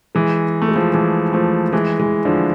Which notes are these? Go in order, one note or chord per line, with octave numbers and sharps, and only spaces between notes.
E3 G#3
A3
G#3
F3 A3
E3 G#3
F3 A3
E3 G#3
E3 G#3
D3 F3